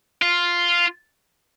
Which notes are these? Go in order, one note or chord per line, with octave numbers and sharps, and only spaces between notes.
F4